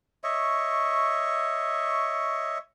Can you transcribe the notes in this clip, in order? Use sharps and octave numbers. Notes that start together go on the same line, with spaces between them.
C#5 D#5 E5 C#6